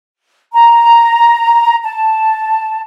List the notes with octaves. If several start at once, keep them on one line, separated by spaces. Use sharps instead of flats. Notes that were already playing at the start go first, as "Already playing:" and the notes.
A#5
A5